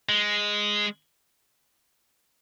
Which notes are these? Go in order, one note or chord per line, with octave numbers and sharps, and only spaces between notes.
G#3